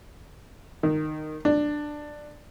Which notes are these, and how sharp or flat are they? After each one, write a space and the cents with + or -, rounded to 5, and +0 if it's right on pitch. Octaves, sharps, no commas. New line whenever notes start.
D#3 -15
D4 +15